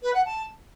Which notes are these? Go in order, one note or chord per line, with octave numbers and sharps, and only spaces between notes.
B4
F#5
A5